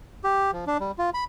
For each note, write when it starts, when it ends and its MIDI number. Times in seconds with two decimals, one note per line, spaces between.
0.24 0.51 67
0.53 0.65 53
0.67 0.77 62
0.80 0.91 55
0.98 1.10 65
1.14 1.24 83